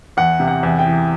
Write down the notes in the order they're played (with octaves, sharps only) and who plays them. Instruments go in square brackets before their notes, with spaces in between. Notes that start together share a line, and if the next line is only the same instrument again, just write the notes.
[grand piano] E2 [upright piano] F#5
[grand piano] C3
[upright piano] F#5
[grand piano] E2
[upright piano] G5
[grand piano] E3